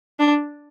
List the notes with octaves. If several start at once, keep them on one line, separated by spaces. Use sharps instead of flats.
D4